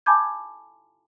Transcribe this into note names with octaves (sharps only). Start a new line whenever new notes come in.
G#5 A5 B5 D6 G6 G#6